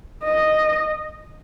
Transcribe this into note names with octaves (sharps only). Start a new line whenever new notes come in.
D#5